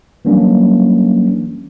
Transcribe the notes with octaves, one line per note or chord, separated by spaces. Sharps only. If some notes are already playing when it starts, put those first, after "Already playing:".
E3 F#3 G3 A#3 C#4 D4